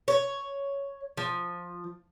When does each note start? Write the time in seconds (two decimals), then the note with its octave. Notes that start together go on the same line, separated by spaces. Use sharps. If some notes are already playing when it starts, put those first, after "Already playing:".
0.08 C#5
1.17 F3